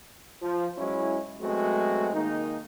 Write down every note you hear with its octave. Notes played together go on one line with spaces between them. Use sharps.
F3
F#3 G#3 C#4 E4
F#3 G#3 A3 B3 C4 F#4
D#3 G#3 A#3 D#4